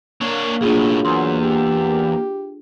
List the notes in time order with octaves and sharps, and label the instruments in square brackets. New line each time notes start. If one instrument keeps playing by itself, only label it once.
[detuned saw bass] A#3 [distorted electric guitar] D4 C#5 [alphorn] A#4
[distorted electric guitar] B1 A2 [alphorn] F#3 [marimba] D4 F4 G#4
[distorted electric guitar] E2 [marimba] C6
[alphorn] G4